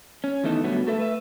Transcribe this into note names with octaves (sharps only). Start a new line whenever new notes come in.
C#4
D#3 E3 A3 B3 D#4 A4
B2 D3 F#3 G3 A3 B3
A3 A4 B4 E5
A3 B4 E5